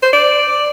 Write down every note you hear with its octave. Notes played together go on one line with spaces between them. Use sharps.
C5
D5